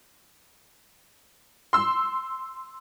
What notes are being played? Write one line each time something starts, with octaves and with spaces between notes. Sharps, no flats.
C6 E6